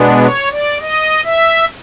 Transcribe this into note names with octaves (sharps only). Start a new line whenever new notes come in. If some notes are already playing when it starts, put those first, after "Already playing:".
Already playing: B2 G#3 B3 D4
C#5
D5
D#5
E5